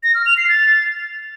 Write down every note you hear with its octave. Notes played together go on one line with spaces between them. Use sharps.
A#6
F6
F7
C7
A6